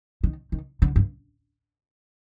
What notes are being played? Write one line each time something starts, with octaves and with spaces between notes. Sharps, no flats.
D#3
D#3
D3
G2